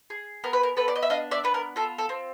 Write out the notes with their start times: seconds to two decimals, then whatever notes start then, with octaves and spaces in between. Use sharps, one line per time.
0.10 G#4
0.44 B3 A#4
0.53 B4
0.63 A#4
0.77 B3 A4 B4
0.88 D5
0.96 D#5
1.03 E5
1.10 D4 D#5 F5
1.31 D5 E5
1.44 B3 B4
1.54 A#4
1.76 F4 A4
1.98 A4
2.09 C4